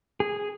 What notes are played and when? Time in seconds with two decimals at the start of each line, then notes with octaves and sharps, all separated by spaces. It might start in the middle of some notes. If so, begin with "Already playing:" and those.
0.20 G#4